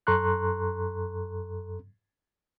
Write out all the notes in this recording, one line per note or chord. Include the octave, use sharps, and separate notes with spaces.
F#2 A4 A#5 C6 C#6 F#6